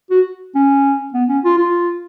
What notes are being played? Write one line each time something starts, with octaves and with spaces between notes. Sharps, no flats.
F#4
C#4
B3
C#4
F4
F4